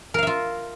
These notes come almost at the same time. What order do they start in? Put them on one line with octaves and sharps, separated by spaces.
A#4 F5 E5 F4